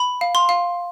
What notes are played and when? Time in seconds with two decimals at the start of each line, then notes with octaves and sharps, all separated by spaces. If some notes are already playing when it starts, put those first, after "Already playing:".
Already playing: B5
0.21 F5
0.35 C6
0.49 F5